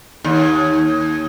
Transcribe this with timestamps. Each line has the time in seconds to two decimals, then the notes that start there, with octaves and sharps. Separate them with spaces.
0.24 D#2